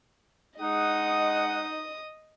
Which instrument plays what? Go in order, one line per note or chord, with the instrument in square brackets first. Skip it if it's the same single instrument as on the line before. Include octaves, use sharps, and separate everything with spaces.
[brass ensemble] G#3 F#5 [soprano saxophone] D#4 [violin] D#5 D#6